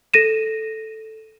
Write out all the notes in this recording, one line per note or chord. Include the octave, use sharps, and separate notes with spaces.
A4 A#6 D#7 E7